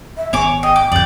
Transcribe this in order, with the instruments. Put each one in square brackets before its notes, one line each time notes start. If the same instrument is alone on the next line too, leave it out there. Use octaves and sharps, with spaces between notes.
[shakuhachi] E5
[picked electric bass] G#1 B3 [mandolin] C#5 D6 [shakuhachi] G#5
[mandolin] D#5 [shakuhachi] G5
[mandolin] D6
[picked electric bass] D1 G1 F2 [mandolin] D5 G6